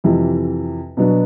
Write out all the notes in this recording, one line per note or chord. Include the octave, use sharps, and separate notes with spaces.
F2 C3 E3
B2 F#3 B3 D4